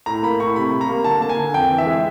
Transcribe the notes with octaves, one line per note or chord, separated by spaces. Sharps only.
A2 A#5
A#3 B5
A2 C#6
C3 B5
G3
A#5
A#3
D3 A5
A#3 A5
G#5
D3
F2 G5
E3
E5
G#3